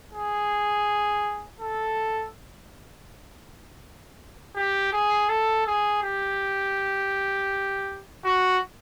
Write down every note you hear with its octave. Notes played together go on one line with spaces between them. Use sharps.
G#4
A4
G4
G#4
A4
G#4
G4
F#4